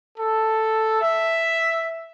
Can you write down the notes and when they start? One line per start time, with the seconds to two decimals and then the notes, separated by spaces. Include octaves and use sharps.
0.19 A4
1.01 E5